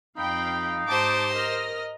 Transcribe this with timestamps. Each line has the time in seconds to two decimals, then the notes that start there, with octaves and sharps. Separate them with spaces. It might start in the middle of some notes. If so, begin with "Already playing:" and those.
0.18 F2 C4 D#4 F5 G5 B5
0.89 G#2 G4 C5 A5 D6
1.34 A#4 D#5 F6 A#6